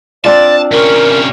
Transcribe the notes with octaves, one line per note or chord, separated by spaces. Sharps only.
C4 D4 F4 D5 A5
C3 C#4 A#4